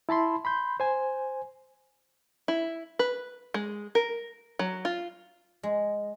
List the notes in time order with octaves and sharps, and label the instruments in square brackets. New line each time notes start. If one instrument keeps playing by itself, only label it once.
[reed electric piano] E4 A5 B5 C6
B5 C6 G6
C5 G#5
[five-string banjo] E4
B4
G#3
A#4
F#3
F4
[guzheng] G#3